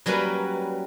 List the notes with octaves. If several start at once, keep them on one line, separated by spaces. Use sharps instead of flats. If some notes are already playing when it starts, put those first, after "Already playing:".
F#3 G3 A#3 C#4 B4